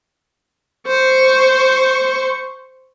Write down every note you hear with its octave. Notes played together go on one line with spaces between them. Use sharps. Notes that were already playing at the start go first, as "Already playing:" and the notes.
C5 C#6